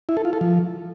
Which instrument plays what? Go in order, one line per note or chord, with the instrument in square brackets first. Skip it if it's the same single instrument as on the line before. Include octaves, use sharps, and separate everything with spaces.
[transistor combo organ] E4
A4
F4
A4
F3